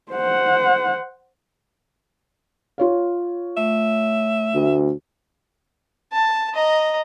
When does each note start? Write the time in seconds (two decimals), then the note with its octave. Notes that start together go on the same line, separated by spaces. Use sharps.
0.12 C5 F#5
2.78 F4 C#5 F5
3.57 A3 E5
4.54 D2
6.13 A5
6.54 D#5 A#5